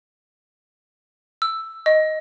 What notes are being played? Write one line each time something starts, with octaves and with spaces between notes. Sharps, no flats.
E6
D#5